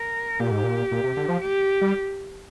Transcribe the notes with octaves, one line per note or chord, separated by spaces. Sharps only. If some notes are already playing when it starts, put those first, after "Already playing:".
Already playing: A#4
A#2 G4
G#2
A#2
A#2
C3
D3
F3
G4
G3